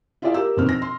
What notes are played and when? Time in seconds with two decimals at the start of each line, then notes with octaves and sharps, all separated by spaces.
0.22 E4 F4 G#4 D5 E5 F5
0.34 G4 A#4 E6
0.57 F1 A#1 B2 C4 D#4 F6
0.69 A#6
0.82 C6